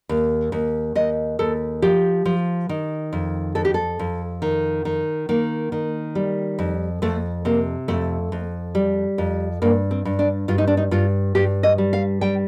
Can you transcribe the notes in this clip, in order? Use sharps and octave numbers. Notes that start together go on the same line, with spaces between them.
D#2
D#2
D#2 D#5
D#2 A4
F3 G4
F3
D#3
F2
F2 A4
G4
A4
F2
D#3
D#3
D#3 A#3
D#3
G3
F2
F2 A3
C3 A#3
F2 A3
F2
G3
F2
G2 A#3
C4
G2
D4
G2 F4
D#4
D4
D#4
G2 F4
G2 G4
D#5
G3
F5
G3 G5